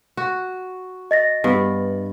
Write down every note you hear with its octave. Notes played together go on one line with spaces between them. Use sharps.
F#4
D#5 A6 A#6
G2 B3